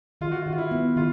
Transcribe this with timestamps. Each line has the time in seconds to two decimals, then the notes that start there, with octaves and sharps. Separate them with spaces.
0.21 D#3 F4
0.31 F#4
0.42 F4
0.46 D#3
0.53 F4
0.58 E4
0.71 B3
0.96 D#3 F4